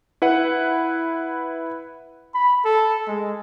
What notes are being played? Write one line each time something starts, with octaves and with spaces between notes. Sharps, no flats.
E4 B4 F#5
B5
A4
G#3